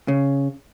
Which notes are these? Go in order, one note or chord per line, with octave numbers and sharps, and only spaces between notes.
C#3